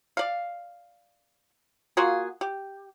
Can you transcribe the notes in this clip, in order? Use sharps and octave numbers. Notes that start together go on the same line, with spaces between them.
D5 F5
A#3 F4 F#4 G#4
G4